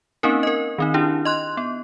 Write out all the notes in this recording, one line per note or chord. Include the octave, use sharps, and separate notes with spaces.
A#3 C4 C#4 D#4 A#4
A#4 D#5
D#3 C4 D#4
D4 E4 G4
D#5 C6 F#6
B3